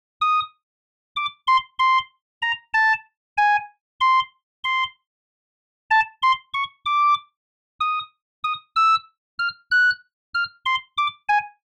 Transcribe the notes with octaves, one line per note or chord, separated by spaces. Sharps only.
D#6
D6
C6
C6
A#5
A5
G#5
C6
C6
A5
C6
C#6
D6
D#6
D#6
E6
F6
F#6
F6
C6
D6
G#5